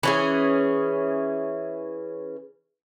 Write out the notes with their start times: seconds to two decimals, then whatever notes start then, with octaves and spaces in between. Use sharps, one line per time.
0.03 E3 C#4 G#4